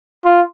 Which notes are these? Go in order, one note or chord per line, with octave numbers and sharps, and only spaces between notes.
F4